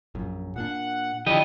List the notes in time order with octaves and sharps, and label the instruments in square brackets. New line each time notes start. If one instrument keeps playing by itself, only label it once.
[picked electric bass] A#1 F#2
[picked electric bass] A#2 A#3 D4 [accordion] F#5
[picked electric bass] D3 F3 [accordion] D4 E4 [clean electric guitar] G4 D#5